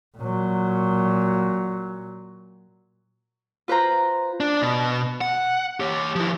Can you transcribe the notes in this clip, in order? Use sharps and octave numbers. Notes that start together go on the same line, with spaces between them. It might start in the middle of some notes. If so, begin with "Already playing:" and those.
A#2 F#3
F4 B4 C5 A#5
D4
B2
F#5
G4 C#5
F3 E4